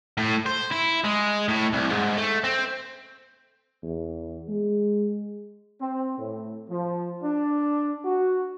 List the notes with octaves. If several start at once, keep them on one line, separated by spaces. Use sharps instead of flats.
A2
C5
E4
G#3
A2
C2
G#2
A3
C4
E2
G#3
C4
A2
F3
D4
F#4